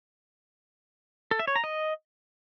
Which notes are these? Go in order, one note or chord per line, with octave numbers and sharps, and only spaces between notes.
A4
E5
C#5
A#5
D#5